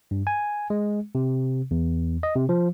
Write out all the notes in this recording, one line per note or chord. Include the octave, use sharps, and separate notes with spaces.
G2
G#5
G#3
C3
E2
D#5
C3
F3